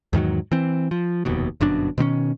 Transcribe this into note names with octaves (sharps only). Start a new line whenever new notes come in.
E2 G#2 D#3 F#3
E3 C4
F3
F1 D#2 B2
G1 F#2 B2 D4
B2 D#3 C4 C#4